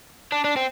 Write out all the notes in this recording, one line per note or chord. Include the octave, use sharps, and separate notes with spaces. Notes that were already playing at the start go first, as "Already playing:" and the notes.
D4
D4
C4